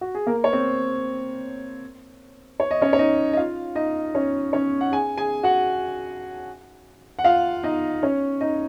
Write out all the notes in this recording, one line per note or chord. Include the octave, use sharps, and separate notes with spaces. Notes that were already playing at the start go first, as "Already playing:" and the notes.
F#4
G#4
A#3 A#4
C#5
C4 C5
C#5
D#5
C#4 C#5
C#5
D#4 D#5
D#5
F4 F5
D#4 D#5
C#4 C#5
C#4 C#5
F#5
G#4 G#5
G#4 G#5
F#4 F#5
F#5
F4 F5
D#4 D#5
C#4 C#5
D#4 D#5